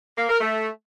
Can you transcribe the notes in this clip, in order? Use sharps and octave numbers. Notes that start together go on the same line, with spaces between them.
A#3
A#4
A3